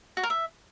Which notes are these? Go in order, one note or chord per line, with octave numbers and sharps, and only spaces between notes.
F#4
A#4
E5